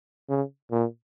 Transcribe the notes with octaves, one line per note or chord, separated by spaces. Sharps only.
C#3
A#2